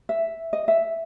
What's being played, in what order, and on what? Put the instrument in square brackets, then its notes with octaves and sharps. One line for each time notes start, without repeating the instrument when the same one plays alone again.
[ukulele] E5
D#5
E5